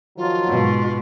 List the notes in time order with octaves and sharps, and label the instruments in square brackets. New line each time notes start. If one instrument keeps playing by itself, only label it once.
[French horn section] D#3 F3 F#3 [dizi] F4
[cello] G#2 B2